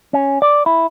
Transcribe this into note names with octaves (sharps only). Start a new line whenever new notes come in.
C#4
D5
E4